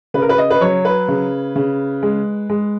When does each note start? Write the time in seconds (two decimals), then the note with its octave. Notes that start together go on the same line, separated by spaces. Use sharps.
0.14 C#3 B4
0.22 A#4
0.29 B4
0.38 D#5
0.50 B4
0.61 F#3 C#5
0.85 B4
1.08 C#3
1.56 C#3
2.03 G#3
2.50 G#3